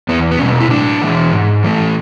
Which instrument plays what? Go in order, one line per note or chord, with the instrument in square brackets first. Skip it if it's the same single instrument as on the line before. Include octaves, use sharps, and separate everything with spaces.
[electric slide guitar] E2 B3
B3
B2 G#3 C#4
E4
A2 D4
E3 G#3
G#2
E3 A3